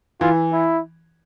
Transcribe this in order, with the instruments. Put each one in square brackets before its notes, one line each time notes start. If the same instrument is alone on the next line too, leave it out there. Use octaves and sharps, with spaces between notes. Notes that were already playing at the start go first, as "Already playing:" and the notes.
[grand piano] E3 [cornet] F4
[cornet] E4